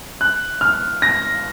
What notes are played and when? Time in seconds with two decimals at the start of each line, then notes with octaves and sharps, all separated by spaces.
0.21 F#6
0.61 F6
1.02 A#6